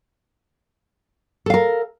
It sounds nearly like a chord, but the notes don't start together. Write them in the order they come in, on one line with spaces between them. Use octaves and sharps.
A4 F5 A#4